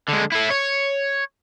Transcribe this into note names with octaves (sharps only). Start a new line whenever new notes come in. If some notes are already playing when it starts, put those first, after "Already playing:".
D3 G#3
E4 A4
C#5